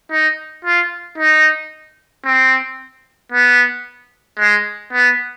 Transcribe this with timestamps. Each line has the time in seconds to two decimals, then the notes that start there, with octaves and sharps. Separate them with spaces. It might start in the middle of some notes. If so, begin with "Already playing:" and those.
0.11 D#4
0.65 F4
1.18 D#4
2.25 C4
3.32 B3
4.39 G#3
4.93 B3